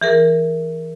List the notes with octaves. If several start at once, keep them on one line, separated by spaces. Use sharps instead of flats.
E3 G#4 A#4